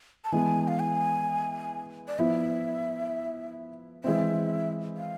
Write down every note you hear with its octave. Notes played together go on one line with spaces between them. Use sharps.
A5
E3 G#3 B3 G#5
F5
G#5
D5
F3 B3 E4 E5
E3 G#3 C4 E5
F5